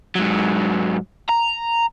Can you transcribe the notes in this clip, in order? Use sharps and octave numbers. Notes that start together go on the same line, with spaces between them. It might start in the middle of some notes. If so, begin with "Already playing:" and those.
G#2 F#3
A#5